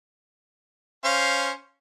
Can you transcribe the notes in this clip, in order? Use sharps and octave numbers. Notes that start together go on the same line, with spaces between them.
C#4 C5 F5